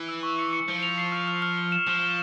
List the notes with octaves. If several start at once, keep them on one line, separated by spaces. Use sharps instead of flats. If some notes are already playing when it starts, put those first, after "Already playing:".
Already playing: E3
E6
C#6
C#7
C#7
F3 C#7
F7
C7
F6
F6
F6
G7
E7
F3 E7
G7